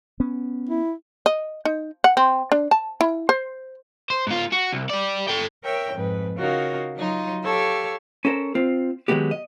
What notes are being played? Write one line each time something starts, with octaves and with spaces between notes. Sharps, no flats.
B3 C#4
E4
D#5
D#4
F#5
C4
D4
A5
E4
C5
C5
G#2 F4
F#4
C2
G4 D5
A4 G5
A#4 C#5 E5 G5
F2 G#2 B4
C#3 D#4 F4 F#4 A#4 C#5
F#3 D#4 F4
G4 A4 C#5 F5 E6
C#4 A4 A#4 C5
C4 F4
D#3 F#3 G#3 B3 G4
D#5